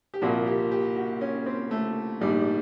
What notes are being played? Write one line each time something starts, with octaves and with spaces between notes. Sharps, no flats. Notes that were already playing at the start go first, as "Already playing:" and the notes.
G4
C2 A#2 F3 F#4
G4
G4
F#4
C#4
C4
A3
A#1 G#2 D#3 G3